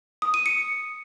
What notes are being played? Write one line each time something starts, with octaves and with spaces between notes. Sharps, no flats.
D#6
D#7
C#7